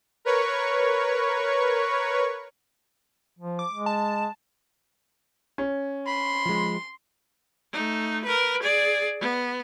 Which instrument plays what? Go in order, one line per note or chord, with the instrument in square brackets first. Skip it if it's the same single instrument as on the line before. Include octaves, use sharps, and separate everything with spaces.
[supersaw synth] A#4 B4 C#5 C#6
[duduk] F3
[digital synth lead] D6
[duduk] G#3
[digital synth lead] A5
[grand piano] C#4
[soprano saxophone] B5 [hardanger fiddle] C6
[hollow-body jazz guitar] F3 G#3
[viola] A3 D#4
A#4 B4
G#4 D5
B3